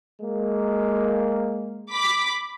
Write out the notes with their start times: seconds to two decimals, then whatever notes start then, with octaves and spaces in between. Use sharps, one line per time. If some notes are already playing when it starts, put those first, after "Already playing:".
0.22 G#3 A#3
1.90 B5 D6 B6